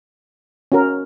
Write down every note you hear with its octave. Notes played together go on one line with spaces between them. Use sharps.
C#4 F#4 A#4